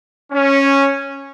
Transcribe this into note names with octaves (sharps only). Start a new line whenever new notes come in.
C#4